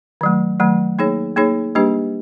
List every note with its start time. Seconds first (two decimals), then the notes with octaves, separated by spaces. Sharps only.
0.21 D#3 F#3 A3
0.60 D#3 F#3 A3
0.99 A#3 D#4 G#4 C#5
1.36 A#3 D#4 G#4 C#5
1.75 G3 A#3 D4 G4 B4